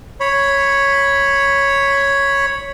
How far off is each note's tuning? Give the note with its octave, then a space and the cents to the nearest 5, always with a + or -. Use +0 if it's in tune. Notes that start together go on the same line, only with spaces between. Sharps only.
C#5 +0 B5 +0